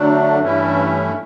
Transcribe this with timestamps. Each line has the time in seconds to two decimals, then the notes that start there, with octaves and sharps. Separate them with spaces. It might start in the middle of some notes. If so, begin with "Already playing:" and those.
Already playing: D3 F#3 A3 D4
0.39 G2 E3 A3 C#4 E4